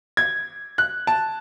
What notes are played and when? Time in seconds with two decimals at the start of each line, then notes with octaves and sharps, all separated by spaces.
0.17 G#6
0.78 F#6
1.07 A5